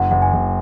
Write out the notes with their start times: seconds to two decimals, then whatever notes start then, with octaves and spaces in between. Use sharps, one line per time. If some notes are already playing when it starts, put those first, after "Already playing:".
Already playing: F#1 F#5
0.11 F#1 F#5
0.22 G#5
0.33 F#1